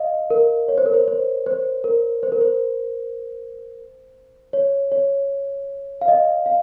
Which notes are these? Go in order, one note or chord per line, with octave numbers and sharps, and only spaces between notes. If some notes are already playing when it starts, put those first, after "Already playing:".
Already playing: D#5 F5
A#4
C#5
C5
A#4
C5
C5
C5
A#4
C5
A#4
C5
C#5
C#5
F5
D#5
F5